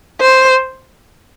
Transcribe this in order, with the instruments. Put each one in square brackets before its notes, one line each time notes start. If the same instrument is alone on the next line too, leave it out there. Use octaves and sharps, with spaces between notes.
[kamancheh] C5